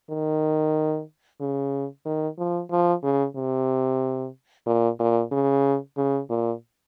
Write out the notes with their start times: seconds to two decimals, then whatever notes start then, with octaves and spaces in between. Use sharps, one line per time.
0.10 D#3
1.40 C#3
2.05 D#3
2.38 F3
2.71 F3
3.03 C#3
3.36 C3
4.66 A#2
4.99 A#2
5.31 C#3
5.97 C#3
6.29 A#2